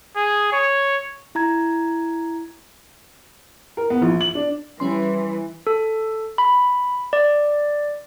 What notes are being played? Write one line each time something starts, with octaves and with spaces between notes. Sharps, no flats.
G#4
C#5
E4 A#5 G#6
A#4
B3
A#1
F#7
D4
E3 G3 C#4 C6
A4
B5
D5